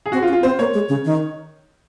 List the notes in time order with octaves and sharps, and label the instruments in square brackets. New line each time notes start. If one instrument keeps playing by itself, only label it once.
[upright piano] G#4
[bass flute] C4 [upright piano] F#4
[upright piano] F4
[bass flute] C#4
[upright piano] F4
[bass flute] C4 [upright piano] C5
[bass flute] A#3 [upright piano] C#5
[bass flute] G#3
C#3
D#3